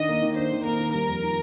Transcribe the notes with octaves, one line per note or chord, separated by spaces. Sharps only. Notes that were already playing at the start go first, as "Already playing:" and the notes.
Already playing: D#3 D4 D#5
A#3
D#3
D4 C5
D#3
A#3 A#4
D#3
G3 A#4
F2
D#3